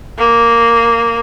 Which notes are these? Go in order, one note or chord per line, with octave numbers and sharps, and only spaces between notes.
A#3